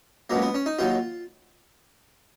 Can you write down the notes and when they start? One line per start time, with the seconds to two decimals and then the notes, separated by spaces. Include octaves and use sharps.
0.30 C#2 B2 F#3 A#3
0.42 B3
0.54 C#4
0.66 D#4
0.79 D#2 D#3 F#3 F4